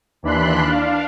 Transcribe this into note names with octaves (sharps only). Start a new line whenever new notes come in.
D#2 E3 D4 B5 C6 F#6
D4 F5